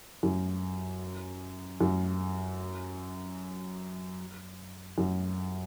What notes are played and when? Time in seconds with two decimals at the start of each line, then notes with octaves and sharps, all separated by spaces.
0.23 F#2
1.81 F#2
4.98 F#2